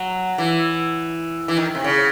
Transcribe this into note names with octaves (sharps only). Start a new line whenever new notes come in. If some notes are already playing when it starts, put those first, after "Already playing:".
Already playing: F#3
E3
E3
D#3
C3
C#3